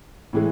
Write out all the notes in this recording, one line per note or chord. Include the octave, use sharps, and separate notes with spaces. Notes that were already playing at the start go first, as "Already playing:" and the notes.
A2 E3 G#3